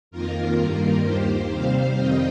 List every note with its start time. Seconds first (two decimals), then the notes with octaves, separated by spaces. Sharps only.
0.11 F2 D#3 A#3 F4 A#4
0.58 G2 D#3 G3 A#3 F4 A#4
1.05 D#2 D#3 A#3 G4 C5
1.51 C3 G3 C4 C5 F5
1.98 F2 D#3 G3 C4 D#5 G5